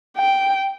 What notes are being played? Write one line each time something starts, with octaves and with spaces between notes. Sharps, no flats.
G5